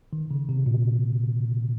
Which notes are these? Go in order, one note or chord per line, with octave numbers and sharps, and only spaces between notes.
D#3
C#3
C3
A#2